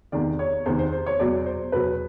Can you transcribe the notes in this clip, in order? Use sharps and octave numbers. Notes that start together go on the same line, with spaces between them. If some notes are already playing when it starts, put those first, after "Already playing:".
E2 C3 D#3 D5
C#5
E2 C3 D#3 C5
C5
C5
C#5
E2 B2 F#3 D5
C5
E2 B2 F#3 B4